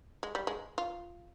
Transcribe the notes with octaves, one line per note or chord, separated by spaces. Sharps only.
G#3
G3
G#3
F4